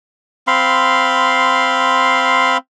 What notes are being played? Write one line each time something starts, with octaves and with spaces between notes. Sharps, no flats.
C4 F5 B5 C6